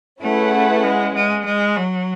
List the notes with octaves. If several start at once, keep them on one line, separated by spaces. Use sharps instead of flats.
A3 C#4 E4 G#4 B4 F#5
G#3
G#3
G#3
F#3